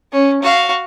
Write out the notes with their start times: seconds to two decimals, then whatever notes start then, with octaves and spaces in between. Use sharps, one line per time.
0.12 C#4
0.42 F#4 F5